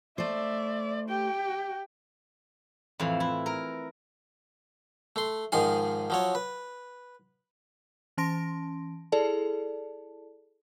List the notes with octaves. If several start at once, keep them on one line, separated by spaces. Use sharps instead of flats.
A3 C5 D5 E5
G4 G5
F2 A2 E3
E4
A#4
A3 C6
G#2 D#3 F3 G#4 G#5
F3 F#3 C#5
B4
E3 C#4 A5 C6 A#6 D7
E4 G#4 A4 D5 A5